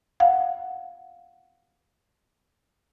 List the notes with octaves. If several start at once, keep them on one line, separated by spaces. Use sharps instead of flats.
F5 F#5